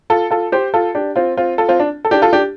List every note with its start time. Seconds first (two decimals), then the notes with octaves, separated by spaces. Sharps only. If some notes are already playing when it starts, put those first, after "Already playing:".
0.10 F4 A4
0.31 F4 A4
0.52 G4 C5
0.74 F4 A4
0.95 D4 G4
1.16 C4 F4
1.37 C4 F4
1.58 F4 A4
1.68 C4 F4
1.80 D4
2.05 A4
2.11 D4 G4
2.22 F4 A4
2.33 D4 G4